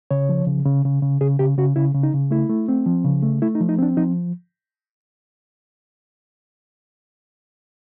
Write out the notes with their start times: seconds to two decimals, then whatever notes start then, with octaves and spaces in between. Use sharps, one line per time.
0.11 C#3 C#5
0.29 F3
0.47 C#3
0.66 C#3
0.85 C#3
1.03 C#3
1.21 C#3 G#4
1.39 C#3 G4
1.58 C#3 F#4
1.76 C#3 E4
1.95 C#3
2.03 D#4
2.14 C#3
2.31 A3 E4
2.50 A3
2.68 C4
2.86 F3
3.04 C#3
3.23 A3
3.42 A3 E4
3.55 D#4
3.60 F3
3.69 D#4
3.79 C4 D4
3.97 F3 D#4